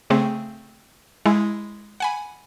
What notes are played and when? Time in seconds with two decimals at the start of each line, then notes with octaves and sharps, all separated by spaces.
0.10 C#3 A3 C4 G#4
1.26 G#3 E4
2.00 F#5 G#5 B5